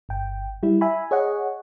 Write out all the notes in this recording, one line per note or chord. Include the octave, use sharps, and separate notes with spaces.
G1 G5
G3 E4
E5 G#5 B5
G#4 C#5 D#5 F#5